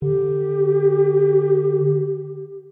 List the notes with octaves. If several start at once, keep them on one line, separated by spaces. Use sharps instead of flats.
D3 G4